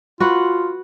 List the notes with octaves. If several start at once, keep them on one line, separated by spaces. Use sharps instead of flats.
F4 F#4 B4 F#5